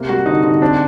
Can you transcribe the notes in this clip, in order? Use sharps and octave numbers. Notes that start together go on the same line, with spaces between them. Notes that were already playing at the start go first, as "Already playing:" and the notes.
Already playing: C3 A#3
G3 F#4
D3 D#4
D3 D#4
C4 D4